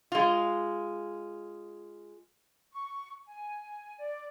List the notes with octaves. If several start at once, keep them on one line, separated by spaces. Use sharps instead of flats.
G#3 F4
C#6
G#5
D5